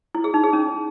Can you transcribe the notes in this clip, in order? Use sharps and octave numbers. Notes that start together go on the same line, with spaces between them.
E4
G#4
D#4
G#4
C#4